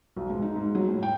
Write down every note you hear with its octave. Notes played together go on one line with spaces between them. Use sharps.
B1
G#2
D#4
G#2
F#3
A2
G5